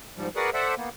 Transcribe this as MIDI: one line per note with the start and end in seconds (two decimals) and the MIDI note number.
0.17 0.29 44
0.17 0.29 53
0.17 0.29 55
0.36 0.50 66
0.36 0.50 68
0.36 0.50 70
0.36 0.50 71
0.36 0.50 74
0.36 0.50 78
0.54 0.75 69
0.54 0.75 72
0.54 0.75 74
0.54 0.75 76
0.54 0.75 78
0.77 0.89 58
0.77 0.89 59